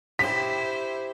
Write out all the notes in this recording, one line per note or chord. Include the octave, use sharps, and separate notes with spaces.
E4 G4 C5 B6